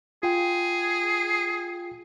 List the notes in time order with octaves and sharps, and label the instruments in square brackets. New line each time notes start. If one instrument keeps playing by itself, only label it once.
[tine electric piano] F4 G5 [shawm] G#4